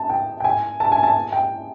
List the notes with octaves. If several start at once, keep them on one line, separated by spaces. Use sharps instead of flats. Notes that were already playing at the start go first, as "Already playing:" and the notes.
Already playing: A5
G5
G5
G#5
A5
G#5
A5
G5